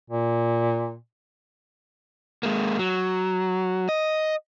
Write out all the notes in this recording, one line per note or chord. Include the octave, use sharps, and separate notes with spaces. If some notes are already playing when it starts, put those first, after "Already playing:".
A#2
G#3 A#3
F#3
D#5